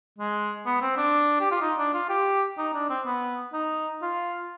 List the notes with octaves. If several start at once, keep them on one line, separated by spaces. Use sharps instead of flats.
G#3
B3
C4
D4
G4
F4
D#4
D4
F4
G4
D#4
D4
C4
B3
D#4
F4